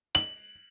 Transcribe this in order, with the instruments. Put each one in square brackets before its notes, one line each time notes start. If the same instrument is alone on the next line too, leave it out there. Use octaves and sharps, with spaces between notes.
[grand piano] F#7